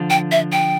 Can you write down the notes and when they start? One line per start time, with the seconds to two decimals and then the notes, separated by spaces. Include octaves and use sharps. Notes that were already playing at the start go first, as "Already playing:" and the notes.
Already playing: D3 F3
0.10 G5
0.32 E5
0.52 G5